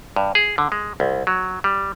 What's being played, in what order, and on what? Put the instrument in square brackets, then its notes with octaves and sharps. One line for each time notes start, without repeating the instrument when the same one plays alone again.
[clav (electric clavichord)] G2
G#4
D3
G#3
C2
F#3
G3